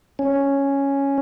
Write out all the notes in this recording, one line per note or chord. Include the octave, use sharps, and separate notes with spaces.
C#4